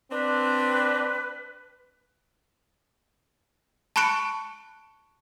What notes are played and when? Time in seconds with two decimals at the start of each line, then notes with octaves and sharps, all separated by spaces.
0.11 C4 D4 B4
3.96 A5 B5 C#6 F#6 C#7 D7